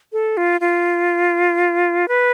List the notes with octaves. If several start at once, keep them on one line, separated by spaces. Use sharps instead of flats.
A4
F4
F4
B4